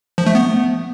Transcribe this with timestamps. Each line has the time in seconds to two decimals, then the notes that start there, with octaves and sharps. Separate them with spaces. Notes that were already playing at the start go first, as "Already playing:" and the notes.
0.18 F3
0.26 A3
0.35 B3